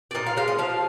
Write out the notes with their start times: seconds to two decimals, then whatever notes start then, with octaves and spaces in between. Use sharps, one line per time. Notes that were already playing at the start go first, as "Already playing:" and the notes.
0.11 D5
0.15 A#2 D#5
0.26 F5
0.37 G#3 F5
0.48 D#5
0.58 F3 F5